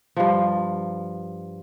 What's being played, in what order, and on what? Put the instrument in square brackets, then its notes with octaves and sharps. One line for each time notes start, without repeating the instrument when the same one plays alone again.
[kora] G2 F3